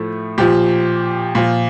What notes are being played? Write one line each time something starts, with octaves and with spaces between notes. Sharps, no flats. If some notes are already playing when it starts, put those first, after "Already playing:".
Already playing: A2 F3 A3
A#2 F3 G4
A#2 F3 F4